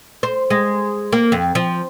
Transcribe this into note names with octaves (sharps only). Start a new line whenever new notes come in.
C5
G#3
A#3
F2
F3